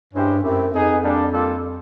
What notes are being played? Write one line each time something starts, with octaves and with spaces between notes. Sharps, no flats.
G2 G#3 C#4 E4 G4 C5
F#2 A3 C4 E4 G4
F2 B3 D#4 G#4
G3 A#3 D4
G3 A#3 D4 F4 A4